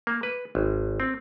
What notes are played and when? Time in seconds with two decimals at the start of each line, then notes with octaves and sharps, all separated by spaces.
0.07 A#3
0.23 B4
0.55 G#1
1.00 C4